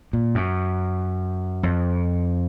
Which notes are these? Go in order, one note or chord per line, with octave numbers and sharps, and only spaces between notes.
A#2
F#2
F2